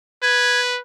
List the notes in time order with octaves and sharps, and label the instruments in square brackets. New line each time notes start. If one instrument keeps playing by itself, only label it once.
[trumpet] B4 [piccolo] G#6